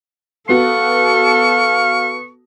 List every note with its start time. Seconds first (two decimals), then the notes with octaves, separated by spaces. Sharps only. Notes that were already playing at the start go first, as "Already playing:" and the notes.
0.49 B3 F#4 A4 F5 C#6